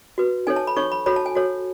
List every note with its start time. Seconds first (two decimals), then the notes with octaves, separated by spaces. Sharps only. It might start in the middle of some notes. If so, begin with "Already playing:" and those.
0.18 F#4 B4
0.47 D#4 A4 C#5 G#5
0.56 A5
0.67 B5
0.76 D#4 A4 C#5 C#6
0.92 B5
1.06 F#4 A4 C#5 B5
1.16 A5
1.26 G#5
1.35 F#4 A4 C#5